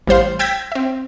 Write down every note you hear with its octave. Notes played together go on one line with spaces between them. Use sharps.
A1 G3 C5 F5
G5 E6 G6 G#6 A#6 B6
C4 E5